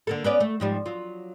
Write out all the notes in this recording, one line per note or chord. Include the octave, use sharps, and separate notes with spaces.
D3 A#3 A4
B3 C#4 D5
A3
G#2 F3 G3
F#3 F4